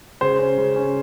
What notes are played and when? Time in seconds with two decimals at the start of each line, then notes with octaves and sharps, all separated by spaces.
0.21 C#3 C5
0.39 C#4
0.58 C#3
0.76 C#4